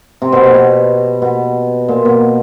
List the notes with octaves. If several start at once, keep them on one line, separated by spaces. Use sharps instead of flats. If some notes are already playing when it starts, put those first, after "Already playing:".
C3
B2
B2
B2
B2
A#2
B2